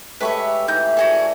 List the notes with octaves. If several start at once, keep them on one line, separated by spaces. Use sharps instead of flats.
G#3 A3 G4 B4 C#5 E5
E3 D#4 G6
F#4 G#4 A4 D5 G#5
D5